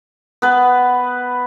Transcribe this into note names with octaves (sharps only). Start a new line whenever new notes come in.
B3 B4